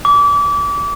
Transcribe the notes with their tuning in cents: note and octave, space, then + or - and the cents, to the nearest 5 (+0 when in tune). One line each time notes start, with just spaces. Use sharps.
D6 -30